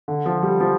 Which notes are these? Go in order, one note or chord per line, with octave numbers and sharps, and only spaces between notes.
D3
F3
G3
F3